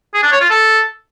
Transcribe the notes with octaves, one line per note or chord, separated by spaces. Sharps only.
G#4
D4
C#5
F4
A4